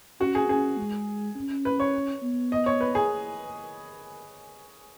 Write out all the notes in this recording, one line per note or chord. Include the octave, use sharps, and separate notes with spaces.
C#4 F#4
G#4
C#4 G#4
G#3
C#4
B4
C#5
B3
D#5
C#5
B4
G#4